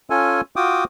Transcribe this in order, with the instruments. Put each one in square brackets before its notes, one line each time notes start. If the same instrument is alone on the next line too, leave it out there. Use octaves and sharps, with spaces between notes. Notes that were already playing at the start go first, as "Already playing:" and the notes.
[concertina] C#4 F4 A4 G#5
F4 F#4 G5 D6 D#6